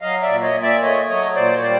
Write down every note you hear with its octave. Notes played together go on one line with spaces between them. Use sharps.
F#3 D#5 F5
D5 E5
A#2
C#5 D#5
A#2
D5 E5
A3 C#5 D#5
F#3 C#5 D#5
A#2 C5 D5
C#5
G3 C5 D5